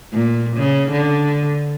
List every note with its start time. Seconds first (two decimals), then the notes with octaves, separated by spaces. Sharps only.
0.13 A#2
0.57 C#3
0.91 D3